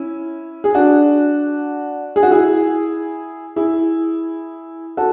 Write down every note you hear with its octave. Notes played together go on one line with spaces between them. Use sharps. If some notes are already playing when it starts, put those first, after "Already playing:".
Already playing: C#4 E4
G#4
D4 F#4
G#4
F#4
E4 G#4
E4 G#4
F#4 A4